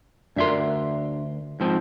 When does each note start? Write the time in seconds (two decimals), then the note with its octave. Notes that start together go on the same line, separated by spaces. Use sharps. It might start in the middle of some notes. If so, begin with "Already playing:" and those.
0.36 D2 D4 F#4 A#4 E5 C6
1.60 G#2 F3 C4